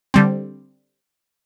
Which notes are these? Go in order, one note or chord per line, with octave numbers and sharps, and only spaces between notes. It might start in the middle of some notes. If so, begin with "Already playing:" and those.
D3 G3 C4